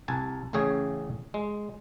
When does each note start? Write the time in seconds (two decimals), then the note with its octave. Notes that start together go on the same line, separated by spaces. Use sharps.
0.08 C2 G#5 A5
0.53 A1 A2 C#3 G#4 C#5 G#5
1.34 G#3